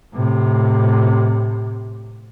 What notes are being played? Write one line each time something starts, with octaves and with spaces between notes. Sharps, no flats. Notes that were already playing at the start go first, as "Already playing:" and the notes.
A2 C3